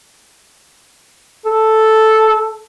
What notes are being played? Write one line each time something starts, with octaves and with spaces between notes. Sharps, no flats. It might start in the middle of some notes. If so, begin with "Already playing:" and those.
A4